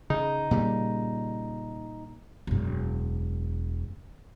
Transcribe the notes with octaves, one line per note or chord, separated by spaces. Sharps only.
C#3 D#4
A#2 C#3 G3
E1 F#2